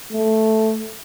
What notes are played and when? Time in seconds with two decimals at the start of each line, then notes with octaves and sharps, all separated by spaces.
0.13 A3